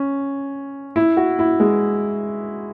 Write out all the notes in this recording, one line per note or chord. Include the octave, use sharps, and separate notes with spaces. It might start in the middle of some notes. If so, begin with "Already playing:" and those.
Already playing: C#4
E4
F#4
E4
G#3